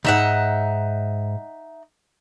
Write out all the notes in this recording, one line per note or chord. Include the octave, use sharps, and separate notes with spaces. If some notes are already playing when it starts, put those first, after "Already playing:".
D2 G#2 D#4 E5 F#5